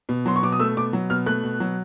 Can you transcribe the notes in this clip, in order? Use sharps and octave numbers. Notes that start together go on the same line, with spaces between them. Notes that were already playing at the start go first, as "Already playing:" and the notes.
B2
F#3 C6
C#6
B2 D6
D#6
A3 E6
B2 D6
F#3
B2 F6
A3 F#6
B2
F#3